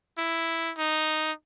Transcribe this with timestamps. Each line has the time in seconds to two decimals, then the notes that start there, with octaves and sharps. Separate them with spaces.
0.18 E4
0.78 D#4